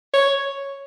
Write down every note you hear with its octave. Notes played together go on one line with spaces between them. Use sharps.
C#5